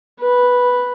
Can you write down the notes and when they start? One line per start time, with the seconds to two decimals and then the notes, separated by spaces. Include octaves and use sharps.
0.21 B4